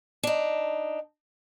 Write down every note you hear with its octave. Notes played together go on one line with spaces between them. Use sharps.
D4 D#4